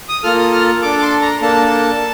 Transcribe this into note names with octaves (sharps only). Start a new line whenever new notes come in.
D#6
A#3 F4 A4 F6
D#6
F6
D4 A4 D6
D6
C6
A#5
A#3 D4 A4 A5